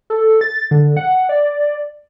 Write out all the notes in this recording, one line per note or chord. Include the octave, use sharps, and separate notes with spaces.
A4
A6
D3
F#5
D5